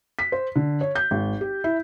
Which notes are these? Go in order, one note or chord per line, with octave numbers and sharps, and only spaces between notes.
B6
C5
D3
C#5
G6
G#1
G4
E4